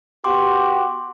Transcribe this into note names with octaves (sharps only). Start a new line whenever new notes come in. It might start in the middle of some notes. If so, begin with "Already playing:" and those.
B3 F#4 G4 G5 C6 D6